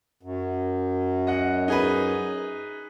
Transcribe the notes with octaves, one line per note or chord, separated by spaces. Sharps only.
F#2
D#5 F#5
D#4 G#4 B4